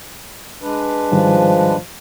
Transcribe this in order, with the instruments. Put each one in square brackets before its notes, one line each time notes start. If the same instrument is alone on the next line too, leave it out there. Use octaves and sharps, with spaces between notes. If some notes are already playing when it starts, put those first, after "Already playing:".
[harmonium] G#3 D4 B4
[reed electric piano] G#2 D#3 G3 [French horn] F3